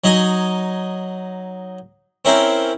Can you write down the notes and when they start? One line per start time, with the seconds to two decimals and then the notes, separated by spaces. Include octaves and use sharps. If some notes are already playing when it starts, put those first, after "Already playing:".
0.04 F#3 D#4 D#5 G#5
2.25 C4 C#4 E4 A#4 C5